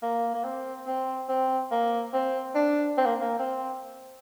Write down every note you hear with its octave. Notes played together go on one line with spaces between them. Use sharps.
A#3
A#3
C4
C4
C4
A#3
C4
D4
C4
A#3
A#3
C4